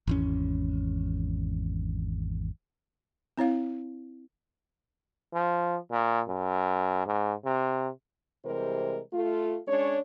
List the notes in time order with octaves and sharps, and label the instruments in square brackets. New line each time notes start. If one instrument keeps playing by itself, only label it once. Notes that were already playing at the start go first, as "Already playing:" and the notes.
[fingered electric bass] G#1 E2 C#4
[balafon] C4 E4 C#5 F5
[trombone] F3
A#2
F#2
G#2
C3
[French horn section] C3 E3 G3 G#3 A#4 C5
A3 F4
G#3 C#4 D4 C#5